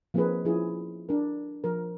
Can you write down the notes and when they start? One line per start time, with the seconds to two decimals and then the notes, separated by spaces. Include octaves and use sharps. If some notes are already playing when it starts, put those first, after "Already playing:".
0.14 F3 A#3 C4 D#4 G#4 B4
0.45 F3 C#4 E4 F4 G#4
1.09 D4 A#4
1.64 F3 A#4